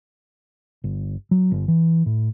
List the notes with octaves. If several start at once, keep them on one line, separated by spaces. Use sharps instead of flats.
G1
F#3
G1
E3
A2